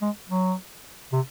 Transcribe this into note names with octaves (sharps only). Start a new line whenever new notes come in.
G#3
F#3
C3